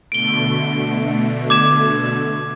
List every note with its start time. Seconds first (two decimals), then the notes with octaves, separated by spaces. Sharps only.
0.12 B2 D3 A3 D7 G7
1.50 D6 G#6 E7